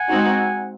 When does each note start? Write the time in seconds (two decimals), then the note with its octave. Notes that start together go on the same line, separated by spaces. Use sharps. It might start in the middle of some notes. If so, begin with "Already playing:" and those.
Already playing: F#5 G#5
0.10 G#3 C4 D#4 F#4